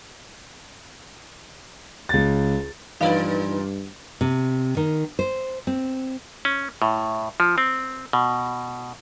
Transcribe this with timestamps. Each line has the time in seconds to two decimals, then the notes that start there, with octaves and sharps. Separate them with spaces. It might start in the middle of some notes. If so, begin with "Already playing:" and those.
2.09 C#2 A6
3.01 G2 A#2 E3 D#4 B4 D5 F5
4.21 C3
4.77 D#3
5.19 C5
5.67 C4
6.45 C#4
6.82 A2
7.40 F3
7.58 C4
8.13 B2